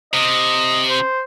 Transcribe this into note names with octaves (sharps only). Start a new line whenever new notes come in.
C3 D#5
C5